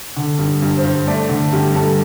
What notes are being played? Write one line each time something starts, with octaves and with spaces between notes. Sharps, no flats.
D3
G2
G2
C5
G2
A3 D5
D3
G2 G4
G2 A4